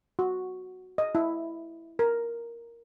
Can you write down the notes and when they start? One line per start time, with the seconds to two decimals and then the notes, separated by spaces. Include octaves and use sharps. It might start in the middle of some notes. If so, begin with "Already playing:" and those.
0.19 F#4
0.98 D#5
1.15 E4
1.99 A#4